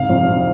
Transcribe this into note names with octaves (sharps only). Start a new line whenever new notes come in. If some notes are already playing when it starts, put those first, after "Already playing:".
Already playing: G#2 C3 F5
F2
C3